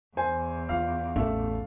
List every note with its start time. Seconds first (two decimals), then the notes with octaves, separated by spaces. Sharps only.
0.17 E2 C5 G#5
0.69 F4 F5
1.16 A1 A3 E5